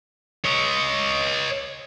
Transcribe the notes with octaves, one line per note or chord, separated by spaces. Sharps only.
C#5 D#5